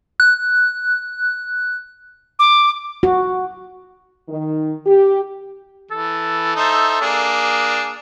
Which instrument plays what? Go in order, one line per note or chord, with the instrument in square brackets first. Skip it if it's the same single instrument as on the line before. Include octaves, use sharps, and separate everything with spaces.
[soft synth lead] F#6
[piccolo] D6
[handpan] F#4
[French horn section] D#3
G4
[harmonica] E3 [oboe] A4
[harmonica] D#4 C5 E5
A#3 D4 G#4